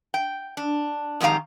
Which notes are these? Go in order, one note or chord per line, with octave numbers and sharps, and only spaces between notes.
G5
D4
F2 G#2 D#3 G4 F5 A#5